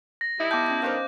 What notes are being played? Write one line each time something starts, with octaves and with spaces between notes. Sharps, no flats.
A#6
G3 D#4 E4
B3 G5 A5 D6 G6
C#4 A#6
G2 D#3 C5 D#5 F5